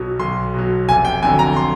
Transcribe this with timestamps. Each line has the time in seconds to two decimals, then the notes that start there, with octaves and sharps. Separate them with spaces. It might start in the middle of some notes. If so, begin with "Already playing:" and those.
Already playing: B1 B2 F#3
0.19 B1 C6
0.54 B2 F#3
0.89 F1 G#5
1.05 G5
1.23 F2 D3 F#3 G#5
1.39 A#5
1.57 C6